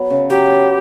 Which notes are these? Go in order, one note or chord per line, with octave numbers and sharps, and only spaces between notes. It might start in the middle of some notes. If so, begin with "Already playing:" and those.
Already playing: F#3 B3
C#3
F#3 G4
B3